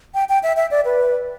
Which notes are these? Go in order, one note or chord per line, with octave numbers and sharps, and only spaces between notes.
G5
G5
E5
E5
D5
B4